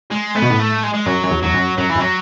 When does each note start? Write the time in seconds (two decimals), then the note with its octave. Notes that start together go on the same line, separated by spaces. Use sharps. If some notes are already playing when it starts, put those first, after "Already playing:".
0.11 G#3
0.35 A2 B3
0.42 B2
0.50 A2
0.60 A3
0.83 G#3
0.94 G#3
1.06 F#2 F#3
1.24 F#2
1.31 E2
1.43 E2 F#3
1.54 F#2
1.78 F#2 F#3
1.90 E3
1.96 F#2
2.00 F#3